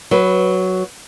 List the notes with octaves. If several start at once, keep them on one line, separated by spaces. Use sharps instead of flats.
F#3 B4